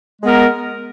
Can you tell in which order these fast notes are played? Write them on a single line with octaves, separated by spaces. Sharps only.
G#3 B3 A#4